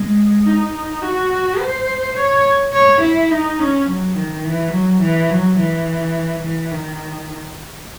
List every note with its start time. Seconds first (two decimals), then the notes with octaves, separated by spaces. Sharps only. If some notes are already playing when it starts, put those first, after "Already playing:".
Already playing: G#3
0.46 D#4
1.02 F#4
1.59 C5
2.16 C#5
2.73 C#5
3.01 E4
3.31 D#4
3.59 C#4
3.88 F#3
4.15 D#3
4.45 E3
4.72 F#3
5.01 E3
5.30 F#3
5.58 E3
6.43 E3
6.72 D#3